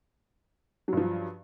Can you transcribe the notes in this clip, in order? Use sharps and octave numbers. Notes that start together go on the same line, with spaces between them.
G2 F3 F#3